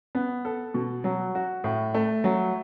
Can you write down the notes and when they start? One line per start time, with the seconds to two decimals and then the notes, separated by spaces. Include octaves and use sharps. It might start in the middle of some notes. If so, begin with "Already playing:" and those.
0.15 B3
0.45 A4
0.74 B2
1.04 F#3
1.35 F#4
1.64 A2
1.94 A3
2.24 F#3